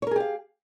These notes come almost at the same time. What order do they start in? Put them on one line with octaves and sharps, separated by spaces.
C#5 A#4 G#4 G4 F5